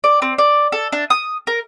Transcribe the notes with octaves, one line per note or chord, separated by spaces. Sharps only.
D5
C4
D5
A4
D4
D#6
A#4